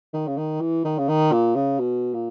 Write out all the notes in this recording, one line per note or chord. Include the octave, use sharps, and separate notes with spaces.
D#3
C#3
D#3
E3
D#3
C#3
D#3
A#2
C#3
B2
A#2